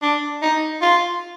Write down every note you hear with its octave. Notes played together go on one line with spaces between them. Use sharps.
D4
D#4
F4